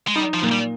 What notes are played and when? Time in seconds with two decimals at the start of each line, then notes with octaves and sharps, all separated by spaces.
0.08 G#3
0.16 G3 D#4
0.34 F3
0.43 A#2
0.52 G3